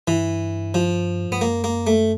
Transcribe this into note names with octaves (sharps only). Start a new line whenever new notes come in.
G2 E3
F3
G2 B3
F#2 A#3
A#3
A3